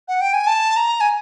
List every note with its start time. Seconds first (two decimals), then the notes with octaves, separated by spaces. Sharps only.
0.08 F#5
0.21 G5
0.33 G#5
0.47 A5
0.77 A#5
1.01 G#5